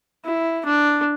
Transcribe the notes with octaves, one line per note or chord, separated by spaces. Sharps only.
E4
D4